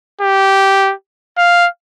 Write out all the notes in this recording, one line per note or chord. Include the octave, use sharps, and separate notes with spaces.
G4
F5